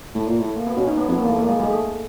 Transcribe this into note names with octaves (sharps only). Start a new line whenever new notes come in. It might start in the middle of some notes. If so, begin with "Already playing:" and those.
A2 A3
A#2
A2
A3
A#3
B3
B2 C#4
D#4
B3
F2 B3
A#3
E2
A3
A#3
G#3
G#3
A3